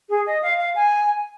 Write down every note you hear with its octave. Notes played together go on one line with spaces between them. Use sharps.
G#4
D#5
F5
F5
G#5